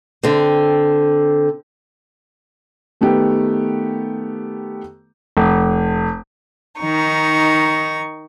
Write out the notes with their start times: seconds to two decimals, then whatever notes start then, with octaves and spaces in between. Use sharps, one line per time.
0.23 D3 C4
3.01 D#3 A3 B3 G4
5.37 F1
6.79 D#3 D#4 C#6